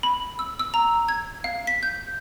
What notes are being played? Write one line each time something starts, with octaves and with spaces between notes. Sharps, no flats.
B5
E6
E6
A#5
G#6
F5
B6
G6